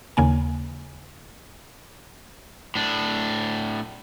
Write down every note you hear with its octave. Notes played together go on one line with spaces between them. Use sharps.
D#2 C#3 A#3 G#5
A2 D4